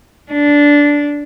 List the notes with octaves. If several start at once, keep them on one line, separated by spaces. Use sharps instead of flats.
D4